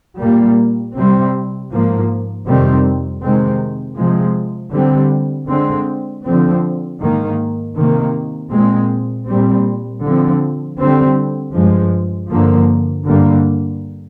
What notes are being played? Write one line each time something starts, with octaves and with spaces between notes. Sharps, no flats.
A#2 G3 A#3
C3 G3 C4
G#2 F3 A#3
F2 C3 D#3 G3 C4
C3 D#3 G#3 C4
C3 F3 G#3
D3 G3 C4
D3 G#3 C4
D3 F3 C4
G#2 D#3 A#3
C3 D#3 A#3
A#2 G#3 C4
A#2 G3 C4
D3 F3 C4
D3 G3 C4
G2 F3 G#3
G2 D3 F3 A#3
G2 D3 G3 A#3